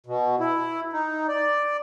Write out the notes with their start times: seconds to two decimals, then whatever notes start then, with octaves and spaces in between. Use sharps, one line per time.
0.06 B2
0.40 E4
0.93 D#4
1.28 D5